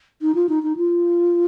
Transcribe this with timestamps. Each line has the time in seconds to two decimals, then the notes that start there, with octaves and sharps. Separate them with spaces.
0.22 D#4
0.35 F4
0.49 D#4
0.63 D#4
0.77 F4